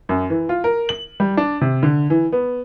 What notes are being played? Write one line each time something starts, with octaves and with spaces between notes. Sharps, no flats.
F#2
E3
F4
A#4
F#7
G3
D4
C3
D3
E3
B3